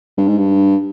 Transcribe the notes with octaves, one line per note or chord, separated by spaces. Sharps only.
G2
G#2
G2